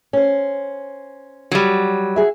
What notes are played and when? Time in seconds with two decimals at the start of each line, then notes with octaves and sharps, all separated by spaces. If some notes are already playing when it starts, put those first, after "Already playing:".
0.13 C#4 C5
1.51 F#3 G3
2.16 F#4 G#4 E5